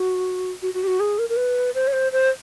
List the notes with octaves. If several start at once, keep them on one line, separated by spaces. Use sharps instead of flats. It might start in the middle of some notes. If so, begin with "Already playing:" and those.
Already playing: F#4
F#4
F#4
G4
F#4
G#4
A#4
A#4
B4
C5
C#5
C5
C5